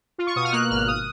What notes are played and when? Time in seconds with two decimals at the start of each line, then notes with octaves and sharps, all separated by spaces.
0.18 F4
0.27 C#6
0.36 B2 D#6
0.44 F6
0.53 A#3 F#6
0.70 G#1 F6
0.88 D#6